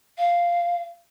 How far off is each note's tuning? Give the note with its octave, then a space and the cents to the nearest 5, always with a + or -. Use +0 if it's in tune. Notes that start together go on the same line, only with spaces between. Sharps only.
F5 -5